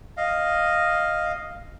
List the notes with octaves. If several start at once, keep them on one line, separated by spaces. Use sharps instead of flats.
D#5 F5